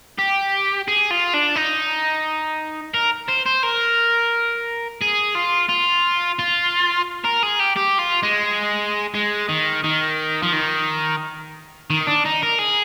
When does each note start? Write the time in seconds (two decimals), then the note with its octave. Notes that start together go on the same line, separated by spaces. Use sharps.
0.18 G4
0.88 G#4
1.11 F4
1.34 D4
1.56 D#4
2.94 A#4
3.28 C5
3.46 C5
3.63 A#4
5.01 G#4
5.35 F4
5.69 F4
6.39 F4
7.24 A#4
7.43 G#4
7.59 G4
7.76 G4
7.99 F4
8.23 G#3
9.14 G#3
9.49 D#3
9.84 D#3
10.42 F3
10.53 D#3
11.90 D#3
12.07 D4
12.25 D#4
12.42 A#4
12.59 G#4